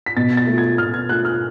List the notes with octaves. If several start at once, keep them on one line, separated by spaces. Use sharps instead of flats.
B6
B2 A6
A6
A3 F4
G#6
B2 F6
G#6
A3 F4 F#6
F6